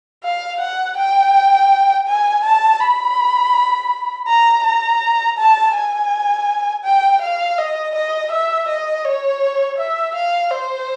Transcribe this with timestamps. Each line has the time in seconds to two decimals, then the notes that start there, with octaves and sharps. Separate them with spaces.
0.23 F5
0.60 F#5
0.97 G5
2.07 G#5
2.44 A5
2.80 B5
4.27 A#5
4.64 A#5
5.38 A5
5.74 G#5
6.84 G5
7.22 F5
7.58 D#5
7.95 D#5
8.31 E5
8.68 D#5
9.04 C#5
9.78 E5
10.15 F5
10.51 C5